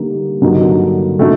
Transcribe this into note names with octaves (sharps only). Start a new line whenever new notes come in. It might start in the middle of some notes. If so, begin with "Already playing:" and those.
Already playing: D3 G3 A#3 D#4
G2 D3 F#3 A#3 D#4
D3 A3 D#4 F#4